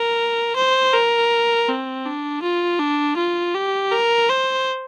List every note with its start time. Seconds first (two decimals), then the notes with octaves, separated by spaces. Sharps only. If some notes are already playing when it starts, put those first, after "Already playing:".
Already playing: A#4
0.56 C5
0.94 A#4
1.68 C4
2.06 D4
2.43 F4
2.79 D4
3.17 F4
3.54 G4
3.92 A#4
4.29 C5